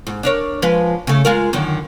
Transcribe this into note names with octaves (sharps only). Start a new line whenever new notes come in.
G#2
D4 A#4 C#5
F3 G#3 B4
C#3 A3
G#3 F4 A#4
F#2 D3 D#3